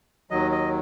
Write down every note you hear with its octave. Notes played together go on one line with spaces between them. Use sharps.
D#2 D#3 F#3 D#5
D#5